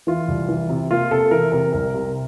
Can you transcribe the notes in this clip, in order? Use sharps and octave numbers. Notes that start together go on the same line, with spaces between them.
E3 F4
C2
E3
C3
A#3 F4
C3 A4
E3 A#4
C3 A#4
C2 A#4
C3